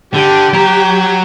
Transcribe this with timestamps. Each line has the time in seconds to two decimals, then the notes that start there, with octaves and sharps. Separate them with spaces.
0.14 D3 G4
0.53 F#3 A#5